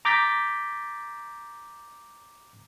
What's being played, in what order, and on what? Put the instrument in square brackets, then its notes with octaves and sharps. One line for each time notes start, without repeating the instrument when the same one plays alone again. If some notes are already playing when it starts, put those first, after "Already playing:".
[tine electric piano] A#5 D6 G6 A6 B6